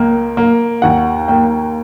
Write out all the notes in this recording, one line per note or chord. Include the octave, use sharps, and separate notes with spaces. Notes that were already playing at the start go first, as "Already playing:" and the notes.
Already playing: C#2 A#3
A#3
D#2 F#5
A#3 G5